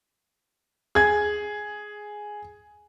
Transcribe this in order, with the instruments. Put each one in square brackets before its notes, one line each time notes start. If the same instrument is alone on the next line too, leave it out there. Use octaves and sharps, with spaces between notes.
[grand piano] G#4 G#6